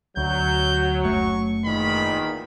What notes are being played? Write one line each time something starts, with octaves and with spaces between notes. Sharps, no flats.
D2 F#3 G6
F#1 A3 C#6
E2 A#2 D#3 B5